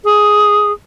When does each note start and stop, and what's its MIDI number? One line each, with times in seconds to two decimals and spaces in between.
0.04 0.72 68